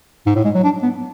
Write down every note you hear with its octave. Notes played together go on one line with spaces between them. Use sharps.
G#2
A2
G#3
F#3
D4
B3